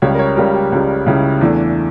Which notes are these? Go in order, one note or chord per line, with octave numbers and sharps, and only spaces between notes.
C#2 C#3 G3 C#5
A#4
C#5
C#2 C#3 G3 A#4
G4
C#2 C#3 G3
C#2 C#3 G3 E4
E2 E3 A3 D4